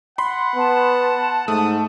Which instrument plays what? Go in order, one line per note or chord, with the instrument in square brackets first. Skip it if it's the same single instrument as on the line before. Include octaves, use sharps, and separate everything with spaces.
[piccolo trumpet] F#5 [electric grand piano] B5 C6
[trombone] B3 [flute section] A5
[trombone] G#2 [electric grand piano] A3 [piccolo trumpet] D#6